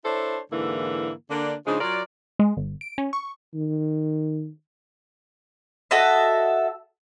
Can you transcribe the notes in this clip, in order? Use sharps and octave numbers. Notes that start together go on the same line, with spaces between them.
D4 E4 A4 C5 C#5
G#2 D3 E3 A#3 E4
D3 A#3 D4
C#3 F3 G#3 D4 D#4
F#3 F4 A#4 D5
G#3
G1
D7
C#4
C#6
D#3
F#4 A4 D#5 E5